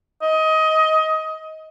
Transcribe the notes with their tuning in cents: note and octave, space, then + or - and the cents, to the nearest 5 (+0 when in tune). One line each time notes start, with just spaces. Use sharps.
D#5 +20